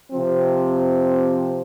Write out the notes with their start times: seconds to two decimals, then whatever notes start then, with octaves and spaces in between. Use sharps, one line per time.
0.12 C3 F3 C4